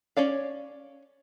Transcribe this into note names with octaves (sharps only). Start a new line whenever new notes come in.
C#4 C#5 D5 F5